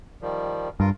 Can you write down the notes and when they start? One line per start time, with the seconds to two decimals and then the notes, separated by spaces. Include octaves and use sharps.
0.22 D#3 F3 G3
0.80 G2 F4 A#4